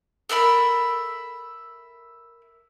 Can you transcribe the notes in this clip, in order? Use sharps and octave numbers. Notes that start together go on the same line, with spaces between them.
A4 A#4 E5 B5